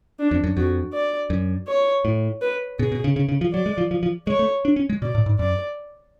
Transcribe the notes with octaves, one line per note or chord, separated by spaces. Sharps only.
D4
F2
F#2
F2 F#4
D5
F#2
C#5
A2
B4
B2 G#4
B2
C#3
C#3
C#3
F3
F#3 D5
G#3
F3
F3
F3
G#3 C#5
A3
D4
C#4
G#3
B2 D5
A2
G#2
F#2 D5